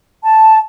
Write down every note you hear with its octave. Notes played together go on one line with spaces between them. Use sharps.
A5